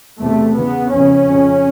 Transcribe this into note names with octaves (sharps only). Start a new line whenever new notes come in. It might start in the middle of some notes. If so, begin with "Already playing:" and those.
E2 C3 A3
E2 C#3 B3
F2 C#3 C#4
F2 C#3